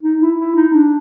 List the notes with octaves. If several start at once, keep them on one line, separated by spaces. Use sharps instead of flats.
D#4
E4
E4
D#4
D4